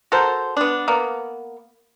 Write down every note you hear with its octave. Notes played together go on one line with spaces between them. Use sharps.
F#4 A4 A#4 C5
B3 D4
A#3 B3